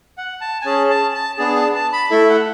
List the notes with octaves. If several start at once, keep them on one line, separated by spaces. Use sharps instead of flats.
F#5
A5
G#5
C#4 G#4 A5
A5
A5
B3 D4 G#4 A5
A5
A5
B5
A3 E4 A4 E5
F#5